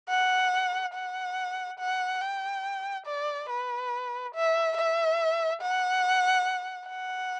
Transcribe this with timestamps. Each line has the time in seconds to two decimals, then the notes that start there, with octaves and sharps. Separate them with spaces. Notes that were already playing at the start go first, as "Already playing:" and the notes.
0.09 F#5
0.94 F#5
1.79 F#5
2.21 G5
3.07 D5
3.49 B4
4.34 E5
4.77 E5
5.62 F#5
6.89 F#5